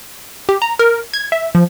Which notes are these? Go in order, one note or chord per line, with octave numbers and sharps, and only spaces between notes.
G4
A#5
A#4
G#6
E5
F3